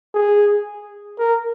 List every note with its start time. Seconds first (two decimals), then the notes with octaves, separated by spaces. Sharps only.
0.14 G#4
1.19 A#4